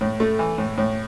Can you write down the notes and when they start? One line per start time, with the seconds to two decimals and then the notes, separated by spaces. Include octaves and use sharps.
0.01 A2
0.20 A3
0.39 E3
0.58 A2
0.78 A2